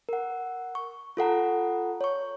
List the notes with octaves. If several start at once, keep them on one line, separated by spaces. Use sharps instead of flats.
A#4 F#5
C#6
F4 A4 F#5 A#5
C#5 C#6